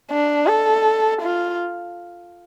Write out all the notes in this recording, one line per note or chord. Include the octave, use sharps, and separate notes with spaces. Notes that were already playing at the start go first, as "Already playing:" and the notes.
D4
A4
F4